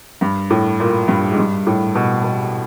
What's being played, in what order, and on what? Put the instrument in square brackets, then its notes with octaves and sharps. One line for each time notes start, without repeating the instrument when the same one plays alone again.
[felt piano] G2
A2
A#2
G2
G#2
G2
A2
B2
B2